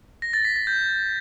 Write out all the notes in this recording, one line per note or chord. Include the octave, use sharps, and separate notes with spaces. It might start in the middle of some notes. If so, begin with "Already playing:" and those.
A#6
A6
B6
A6
G6